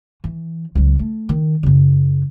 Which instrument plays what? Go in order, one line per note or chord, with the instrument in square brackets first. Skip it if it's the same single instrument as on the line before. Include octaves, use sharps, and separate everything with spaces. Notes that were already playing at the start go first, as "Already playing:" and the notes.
[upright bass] E3
C#2 F#3
A3
D#3
F#2 C#3